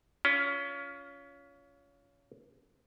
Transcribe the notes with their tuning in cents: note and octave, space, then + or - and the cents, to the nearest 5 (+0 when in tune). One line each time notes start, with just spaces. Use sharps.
C#4 +25 F4 +0